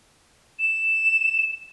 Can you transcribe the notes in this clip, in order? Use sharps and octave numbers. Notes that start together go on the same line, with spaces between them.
E7